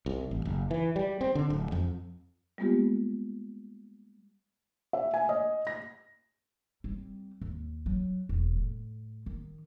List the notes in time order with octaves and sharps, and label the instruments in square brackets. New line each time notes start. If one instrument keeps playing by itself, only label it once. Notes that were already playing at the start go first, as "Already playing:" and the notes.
[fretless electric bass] C2
A1
F#1
E3
G3
C4
D3
D1
F2
[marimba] G3 G#3 A#3 B3 F4 G4
[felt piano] E5
G#5
D#5
A#6
[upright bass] G3 C4
D#2
F#3
E1
A2
D#3